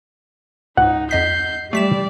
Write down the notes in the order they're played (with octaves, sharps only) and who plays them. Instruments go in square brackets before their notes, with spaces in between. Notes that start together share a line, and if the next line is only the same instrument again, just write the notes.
[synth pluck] C#2 G#2 [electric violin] D#4 [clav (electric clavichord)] F#5
[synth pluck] F2 D#5 B6 [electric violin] G6 C7
[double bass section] G3 [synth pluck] A3 B6 E7 [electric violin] D5